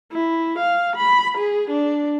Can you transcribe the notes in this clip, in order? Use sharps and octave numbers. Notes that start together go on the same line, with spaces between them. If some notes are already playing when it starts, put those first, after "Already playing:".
E4
F5
B5
G#4
D4